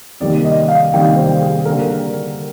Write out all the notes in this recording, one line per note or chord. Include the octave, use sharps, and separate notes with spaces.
C3 D#3 G3 A#3 D5
D#5
F5
C3 D#3 G3 A#3 G5
C5
G#4
D3 G3 A#3 A#4